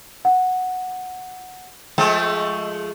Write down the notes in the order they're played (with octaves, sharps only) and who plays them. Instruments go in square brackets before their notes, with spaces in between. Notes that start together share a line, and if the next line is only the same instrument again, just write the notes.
[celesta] F#5
[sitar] F3 G#3 A3 [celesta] G5